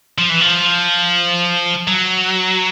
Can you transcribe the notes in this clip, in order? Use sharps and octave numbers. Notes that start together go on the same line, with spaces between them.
F3
E3
F3
F#3